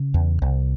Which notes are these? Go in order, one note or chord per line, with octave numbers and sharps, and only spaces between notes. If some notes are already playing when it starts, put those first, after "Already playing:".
Already playing: C#3
E2
C2